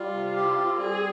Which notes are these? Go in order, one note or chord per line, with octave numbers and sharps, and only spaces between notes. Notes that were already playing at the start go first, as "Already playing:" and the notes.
Already playing: G3 F4
C3
G4
C4
G3 G#4